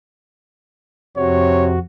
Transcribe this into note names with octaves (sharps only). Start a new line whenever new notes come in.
F2 C3 F#4 C#5